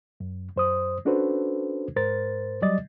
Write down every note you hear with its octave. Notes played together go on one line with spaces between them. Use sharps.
F#2
F#2 C5 D#6
C#4 D4 F#4 A4 B4 C5
G#2 A#4 C5 A6
F#3 G3 D5 D#5 A6